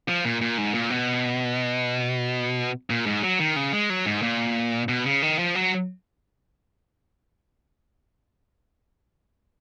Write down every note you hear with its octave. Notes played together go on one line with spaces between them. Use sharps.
F3
A#2
A#2
G#2
A#2
B2
A#2
G#2
F#3
D#3
C#3
G#3
F#3
G#2
A#2
B2
C#3
D#3
F3
F#3